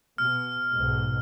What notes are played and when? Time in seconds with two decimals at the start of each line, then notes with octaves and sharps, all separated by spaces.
0.18 B2 F6
0.72 B1 G#2 B2